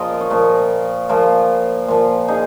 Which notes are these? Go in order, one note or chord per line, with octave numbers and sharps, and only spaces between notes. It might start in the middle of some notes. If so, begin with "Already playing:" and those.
Already playing: A#2 F3 F4 A#4 D#5 F5
C#5
A#2 F3 A#4 D#5
A#2 F3 F4 A#4
A#2 F3
D#4 G#4